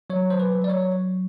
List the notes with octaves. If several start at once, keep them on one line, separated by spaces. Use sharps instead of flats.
F#3 C#5
C5
B4
F#3
D5
C#5